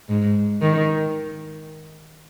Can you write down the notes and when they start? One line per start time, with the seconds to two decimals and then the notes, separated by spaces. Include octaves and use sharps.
0.10 G#2
0.62 D#3